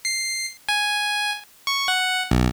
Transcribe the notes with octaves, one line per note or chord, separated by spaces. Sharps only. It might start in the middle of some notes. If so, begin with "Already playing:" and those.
C7
G#5
C#6
F#5
B1